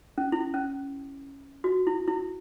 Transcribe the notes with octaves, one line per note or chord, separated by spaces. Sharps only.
C#4
E4
C#4
F#4
E4
E4